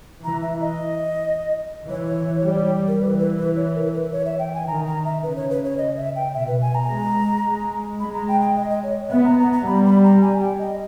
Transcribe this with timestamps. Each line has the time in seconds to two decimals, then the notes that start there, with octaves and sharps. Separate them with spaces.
0.24 E3 A#5
0.42 E5
0.61 D#5
1.89 E3 C#5
2.45 G3
2.88 A#4
3.00 E3 B4
3.19 B4
3.38 B4
3.56 C#5
3.75 A#4
3.94 B4
4.12 C#5
4.26 E5
4.39 G5
4.54 G#5
4.67 D#3 A#5
4.86 A#5
5.05 E5
5.22 C#3 B4
5.36 C#5
5.50 B4
5.65 C#5
5.78 D#5
5.97 E5
6.16 G5
6.34 B2 E5
6.48 B4
6.62 G#5
6.75 A#5
6.89 G#3
7.44 G#3
8.00 G#3 B5
8.14 A#5
8.28 G5
8.41 G5
8.56 D#5
8.70 D#5
8.83 C#5
9.11 B3 E5
9.25 A#5
9.39 A#5
9.52 A#5
9.67 G3 B5
9.85 B5
10.04 A#5
10.22 G#5
10.41 G5
10.59 D#5